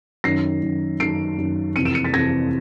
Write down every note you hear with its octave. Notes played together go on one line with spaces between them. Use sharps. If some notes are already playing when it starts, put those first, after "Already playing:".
F#2 D#3 A#6 C7
F#2 D#3
F#2 D#3 C7 D7
F#2 D#3
F2 C3 E3 C#7 D#7
D7 E7
C#7 D#7
A6 B6
F2 C3 E3 G#6 A#6